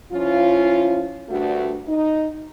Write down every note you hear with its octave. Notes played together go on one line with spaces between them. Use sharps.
F3 C#4 E4 F4
D2 G2 A3 F#4
D#4